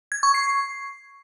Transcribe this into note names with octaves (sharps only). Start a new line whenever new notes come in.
G#6
C#6
C7